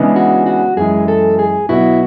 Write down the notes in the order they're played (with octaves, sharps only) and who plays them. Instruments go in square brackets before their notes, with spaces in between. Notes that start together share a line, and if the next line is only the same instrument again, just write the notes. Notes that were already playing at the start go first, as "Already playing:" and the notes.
Already playing: [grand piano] C#3 E3 G#3 B3 D4
[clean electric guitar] F#4
F#4
[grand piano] F#2 E3 G#3 [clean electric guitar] G#4
[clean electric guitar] A4
G#4
[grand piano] B2 F#3 B3 F#4 [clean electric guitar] E4